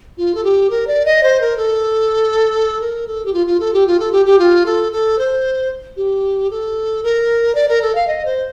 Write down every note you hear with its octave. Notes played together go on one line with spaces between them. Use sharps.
F4
A4
G4
A#4
D5
D#5
C5
A#4
A4
A#4
A4
G4
F4
F4
A4
G4
F4
A4
G4
G4
F4
A4
A4
C5
G4
A4
A#4
D5
A#4
A4
F5
D#5
C5